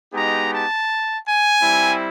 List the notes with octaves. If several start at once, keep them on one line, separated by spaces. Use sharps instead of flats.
G#3 B3 D#4 G4 A#5
A5
G#5
G3 C4 E4